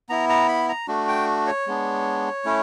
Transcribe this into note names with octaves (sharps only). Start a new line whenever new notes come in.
B3 E4 A#5
A#5
B5
A#5
A3 D4 F#4
G5
C#5
G#3 B3 D4
A3 C#4 E4